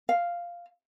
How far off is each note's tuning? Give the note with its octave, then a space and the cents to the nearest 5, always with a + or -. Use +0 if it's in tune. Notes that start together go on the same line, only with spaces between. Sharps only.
F5 -5